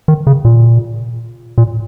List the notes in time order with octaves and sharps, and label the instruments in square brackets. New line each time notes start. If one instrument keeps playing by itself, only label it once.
[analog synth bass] D#3
C#3
A#2
A#2